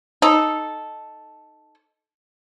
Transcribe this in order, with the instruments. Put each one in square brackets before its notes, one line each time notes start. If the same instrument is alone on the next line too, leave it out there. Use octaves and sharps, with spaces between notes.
[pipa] D#4 A4